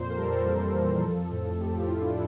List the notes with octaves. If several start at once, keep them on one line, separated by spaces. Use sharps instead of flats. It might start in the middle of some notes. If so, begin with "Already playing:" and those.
Already playing: F2 A#2 C5
A#4
G3 A4
E3
F2
F3
A2
F3 G4
F4
A2 E4
D4